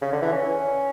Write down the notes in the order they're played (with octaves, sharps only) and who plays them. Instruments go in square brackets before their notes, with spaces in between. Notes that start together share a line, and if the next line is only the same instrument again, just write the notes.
[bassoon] C#3
D3
E3
C#4